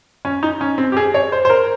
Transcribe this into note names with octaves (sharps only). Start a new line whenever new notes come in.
C#4
D#4
C#4
C4
G4
G#4
C#5
C5
C5
A#4